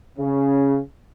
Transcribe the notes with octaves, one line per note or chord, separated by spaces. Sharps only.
C#3